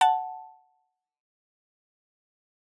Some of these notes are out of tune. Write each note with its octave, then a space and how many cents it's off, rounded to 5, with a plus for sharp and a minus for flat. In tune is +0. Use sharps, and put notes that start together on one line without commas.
F#5 +0 A5 +0